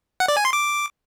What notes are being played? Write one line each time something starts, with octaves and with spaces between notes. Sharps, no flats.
F#5
D5
G#5
C6
D6